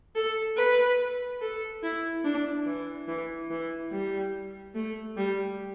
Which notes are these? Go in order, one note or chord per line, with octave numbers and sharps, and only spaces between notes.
A4
B4
A4
E4
D4
E3
E3
E3
G3
A3
G3